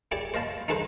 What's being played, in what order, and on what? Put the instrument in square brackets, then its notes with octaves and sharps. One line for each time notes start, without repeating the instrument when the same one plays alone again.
[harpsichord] E4 G4 G#4 D5
C5 D#5 F5 A5 B5
D#4 E4 G#4 A4 B4 C5